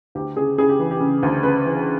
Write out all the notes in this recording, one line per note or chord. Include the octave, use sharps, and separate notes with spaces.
D2 G4
C#3 G#4
C#3 G#4
G4
E3
G4
C#3
D2
C#3 B4
E3